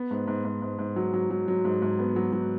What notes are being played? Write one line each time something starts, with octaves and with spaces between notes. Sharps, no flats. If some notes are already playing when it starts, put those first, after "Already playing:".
Already playing: B3
G#2
G#2
G#2
G#2
G#2
F#3
F#3
F#3
F#3
G#2
G#2
B3
F#3
F#3